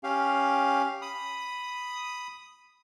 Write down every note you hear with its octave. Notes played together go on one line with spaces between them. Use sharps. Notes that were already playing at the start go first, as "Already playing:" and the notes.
C#4 G4 F5
B5 D#6